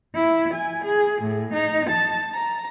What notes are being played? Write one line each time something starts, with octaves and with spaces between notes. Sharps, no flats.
E4
G#5
G#4
A2
D#4
A5
A#5